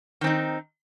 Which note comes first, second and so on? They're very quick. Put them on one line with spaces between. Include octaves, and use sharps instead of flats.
D#3 C4 D#4